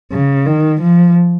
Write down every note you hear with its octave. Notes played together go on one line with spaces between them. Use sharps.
C#3
D#3
F3